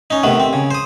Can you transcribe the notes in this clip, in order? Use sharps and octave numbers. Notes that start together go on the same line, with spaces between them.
C#4 D#4
C3 D#3 A3 B3
C4
C#3
C5 D#6